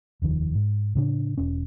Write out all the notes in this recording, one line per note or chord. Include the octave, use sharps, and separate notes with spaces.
F1 D#2 D#3 F3
G#2
A2 C#3 D4
E1 C#4